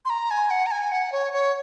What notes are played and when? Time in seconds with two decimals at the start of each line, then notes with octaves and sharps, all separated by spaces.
0.05 C6
0.10 A#5
0.31 G#5
0.50 F#5
0.66 A#5
0.71 G#5
0.92 F#5
1.12 C#5
1.33 C#5